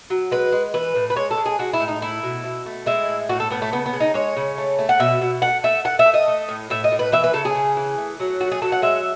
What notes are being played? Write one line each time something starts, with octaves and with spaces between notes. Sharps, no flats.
F#3
G#3 B4
G#3
E3 B4
A2
B4
G#3 C#5
A4
G#3
G#4
G#3 F#4
E4
A2
D#4
A3 E4
B2
B2
A3
G#3 E4
A2
A2 F#4
A4
A2 B3
A3
C#3 B3
B3
C#3
D#4
G#3 C#5
C#3
A3
A3
F#5
B2 E5
B2
A3 F#5
A3 E5
A3 F#5
E5
A3
D#5
A3
A2
A2 E5
D#5
A2
B4
E3 E5
B4
C#3 A4
G#4
C#3
E3
A3
F#3
A3 F#4
G#4
F#3 A4
F#5
G#3 E5